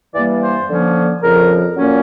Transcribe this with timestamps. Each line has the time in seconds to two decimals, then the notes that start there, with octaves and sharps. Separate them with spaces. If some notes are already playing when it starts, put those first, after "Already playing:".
0.14 G2 E3 G3 A#3 D5
0.41 C5
0.68 D3 F3 A#3 C#4
1.22 F2 C#3 F3 A#4
1.77 A#2 F#3 A#3 C#4